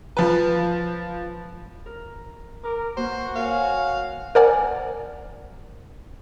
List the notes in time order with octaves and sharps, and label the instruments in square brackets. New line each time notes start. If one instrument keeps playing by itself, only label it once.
[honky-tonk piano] F3 B4
[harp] A#4
[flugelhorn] A#4 [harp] D6
[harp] A#3 B4 [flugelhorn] F#4 [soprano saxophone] C5
[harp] A#4 C#5 G#5 [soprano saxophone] F5
[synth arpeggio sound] A#4 C5 D5 F#5 G#5